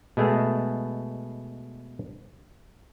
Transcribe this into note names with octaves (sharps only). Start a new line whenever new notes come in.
B2 G#3 A3 B3 G#4